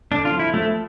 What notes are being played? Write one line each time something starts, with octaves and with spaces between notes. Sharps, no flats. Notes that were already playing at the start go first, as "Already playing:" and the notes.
D3 D4
F4
F3
E4
F3 A3